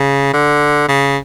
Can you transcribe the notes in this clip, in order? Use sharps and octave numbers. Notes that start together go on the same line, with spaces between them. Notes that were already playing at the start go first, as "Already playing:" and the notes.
Already playing: C#3
D3
C#3